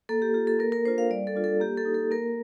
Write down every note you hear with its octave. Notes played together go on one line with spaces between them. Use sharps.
A#3 A4
G4
F4 G4
A4
A#3 A#4
A#4
D4 F4 C5
F5
G3 D5
A4
D4 F4
A4
A#3 G4
A4
D#4
A4
A#3 A#4